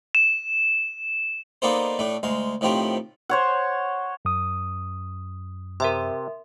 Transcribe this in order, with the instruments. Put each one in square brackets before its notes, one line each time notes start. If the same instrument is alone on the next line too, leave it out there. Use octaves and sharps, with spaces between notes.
[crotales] E7
[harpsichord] A#3 B3 D4 D#4 A4 C5
A2 A3 D4
D2 G#3 F5
A2 D#3 F3 C4 G4
[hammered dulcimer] C5 C#5 F#5
[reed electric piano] F#2 D#6
[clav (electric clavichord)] C3 [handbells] A#4 E5 C6